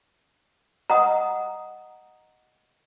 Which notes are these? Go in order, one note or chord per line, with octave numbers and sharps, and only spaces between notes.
D#5 F#5 A#5 D#6